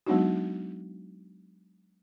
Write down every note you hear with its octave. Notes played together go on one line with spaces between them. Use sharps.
F#3 G#3 B3 D4 D#4 F#4